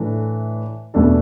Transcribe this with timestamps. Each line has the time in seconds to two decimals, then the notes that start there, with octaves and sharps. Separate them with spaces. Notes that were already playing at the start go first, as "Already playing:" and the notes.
Already playing: A2 E3 A3 D4
0.94 E2 B2 A3 D4 A4